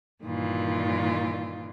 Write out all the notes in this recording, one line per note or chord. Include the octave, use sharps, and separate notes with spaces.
G2 A#2 D#3 E3 F4